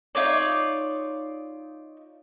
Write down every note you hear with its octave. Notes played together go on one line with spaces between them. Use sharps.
D#4 F4 C#5 D5